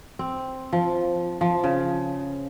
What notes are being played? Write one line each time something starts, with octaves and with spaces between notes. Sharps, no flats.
C4
F3
F3
C#3